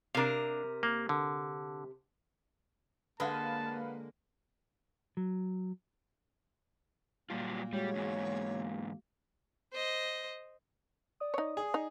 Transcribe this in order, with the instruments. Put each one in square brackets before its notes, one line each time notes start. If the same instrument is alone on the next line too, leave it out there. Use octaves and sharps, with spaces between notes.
[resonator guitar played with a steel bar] C3 A#4 [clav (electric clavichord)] D4 F5
[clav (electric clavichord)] A#3
D3
[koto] D3 G#3 [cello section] A#3 [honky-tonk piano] B4 F5 F#5 [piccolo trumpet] A5
[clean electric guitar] F#3
[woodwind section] A#2 A#3 [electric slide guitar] F#3 G3 F4
[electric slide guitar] G3 [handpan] G#3 F#4 [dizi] C#5
[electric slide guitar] E2 G#2 [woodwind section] A#3
[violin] C5 D#5
[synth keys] D5 D#6
[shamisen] D#4 C#5
[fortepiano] G#4
[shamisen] D#4